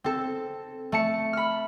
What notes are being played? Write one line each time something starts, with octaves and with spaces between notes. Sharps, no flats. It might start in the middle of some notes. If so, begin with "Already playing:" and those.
C4 A4
A3 A5 C#7
B5 F6